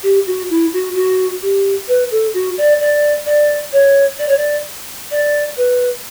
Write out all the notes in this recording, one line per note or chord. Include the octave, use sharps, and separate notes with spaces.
G4
F#4
E4
F#4
F#4
G4
B4
A4
F#4
D5
D5
D5
C#5
D5
C#5
D5
D5
B4